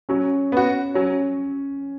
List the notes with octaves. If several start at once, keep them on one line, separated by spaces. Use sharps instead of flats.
F#3 C#4 C#5
B3 F#4
F#3 C#4 C#5